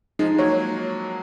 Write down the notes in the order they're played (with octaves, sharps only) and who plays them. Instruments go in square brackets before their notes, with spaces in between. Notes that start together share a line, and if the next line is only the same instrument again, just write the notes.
[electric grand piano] F3 G#3 [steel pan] D#4
[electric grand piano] G#3
[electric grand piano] F#3 A#3 [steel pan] C#5